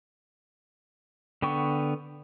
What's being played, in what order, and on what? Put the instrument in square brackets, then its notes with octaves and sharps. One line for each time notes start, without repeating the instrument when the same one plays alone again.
[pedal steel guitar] D3 B3 G5 C#6